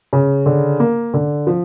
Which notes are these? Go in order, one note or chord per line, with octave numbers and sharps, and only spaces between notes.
C#3
D3
A#3
D3
F3